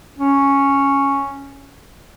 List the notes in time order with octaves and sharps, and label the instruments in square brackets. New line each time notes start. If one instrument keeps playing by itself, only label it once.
[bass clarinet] C#4